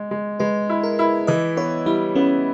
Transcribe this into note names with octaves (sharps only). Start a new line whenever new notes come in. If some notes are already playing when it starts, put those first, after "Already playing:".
Already playing: G#3
G#3
G#3 B4
E4
A#4
E4
E3 D#5
B3 C#5
G3 E4
B3 C#4